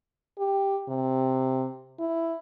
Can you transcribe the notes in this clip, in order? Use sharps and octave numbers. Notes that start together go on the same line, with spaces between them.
G4
C3
E4